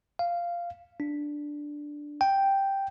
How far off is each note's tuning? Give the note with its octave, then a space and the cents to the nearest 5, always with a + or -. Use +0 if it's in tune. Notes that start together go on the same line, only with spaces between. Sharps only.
F5 -10
D4 +0
G5 +0